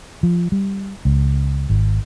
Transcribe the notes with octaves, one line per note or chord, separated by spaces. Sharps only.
F3
G3
C#2
G#1